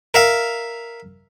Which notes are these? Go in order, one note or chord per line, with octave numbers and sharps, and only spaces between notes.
A#4 E5 F5